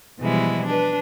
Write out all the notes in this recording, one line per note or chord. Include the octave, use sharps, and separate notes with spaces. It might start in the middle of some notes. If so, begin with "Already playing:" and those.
B2 E3 F3 G3 G#3 E4
D4 B4